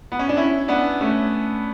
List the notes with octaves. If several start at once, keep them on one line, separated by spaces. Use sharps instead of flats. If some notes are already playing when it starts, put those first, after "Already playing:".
B3
C#4
D4
C#4 E4
B3 D4
A3 C#4